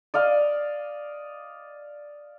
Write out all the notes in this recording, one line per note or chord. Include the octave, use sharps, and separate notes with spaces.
D5 D#5 F5